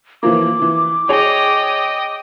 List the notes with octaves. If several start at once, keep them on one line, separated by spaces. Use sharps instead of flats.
E3 F3 A#3 D6
E3
G#4 C#5 D#5 G5